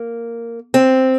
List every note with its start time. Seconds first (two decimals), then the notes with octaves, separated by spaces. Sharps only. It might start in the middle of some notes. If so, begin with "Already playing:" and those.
Already playing: A#3
0.74 C4